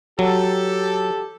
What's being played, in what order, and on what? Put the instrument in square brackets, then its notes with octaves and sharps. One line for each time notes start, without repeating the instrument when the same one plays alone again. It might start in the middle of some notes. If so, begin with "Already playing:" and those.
[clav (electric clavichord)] F#3 [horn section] G4 A4